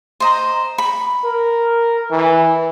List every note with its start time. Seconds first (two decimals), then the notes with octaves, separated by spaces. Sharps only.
0.20 C5 D#5 A#5
0.78 B5
1.24 A#4
2.11 E3